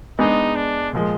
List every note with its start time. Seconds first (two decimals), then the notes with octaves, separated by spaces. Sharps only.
0.19 G#3 B3 D4 D#4 G#4
0.56 D4
0.93 A#2 F3 G#3